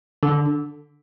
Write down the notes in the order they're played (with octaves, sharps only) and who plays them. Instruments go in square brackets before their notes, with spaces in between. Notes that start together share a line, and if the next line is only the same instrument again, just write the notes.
[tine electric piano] D3